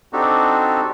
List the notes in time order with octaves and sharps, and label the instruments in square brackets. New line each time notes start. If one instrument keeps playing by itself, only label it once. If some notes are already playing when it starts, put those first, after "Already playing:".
[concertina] C4 D4 D#4 F#4 G4 A4